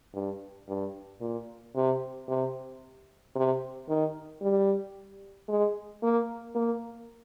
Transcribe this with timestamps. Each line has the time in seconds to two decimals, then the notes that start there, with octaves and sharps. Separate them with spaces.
0.14 G2
0.68 G2
1.21 A#2
1.75 C3
2.28 C3
3.35 C3
3.88 D#3
4.42 G3
5.48 G#3
6.03 A#3
6.55 A#3